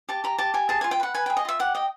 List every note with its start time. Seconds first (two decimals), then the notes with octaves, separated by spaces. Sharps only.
0.09 G4 A5
0.24 G4 A#5
0.38 G4 A5
0.54 G4 G#5
0.69 G#4 A5
0.81 F4 G#5
0.91 G5
1.00 B4 F#5
1.15 B4 G#5
1.26 G#4 G5
1.37 D#5
1.45 F4 E5
1.59 G4 F#5
1.75 D#5 G5